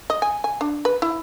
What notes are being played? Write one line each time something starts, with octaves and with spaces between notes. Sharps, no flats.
D#5
G#5
G#5
D4
B4
E4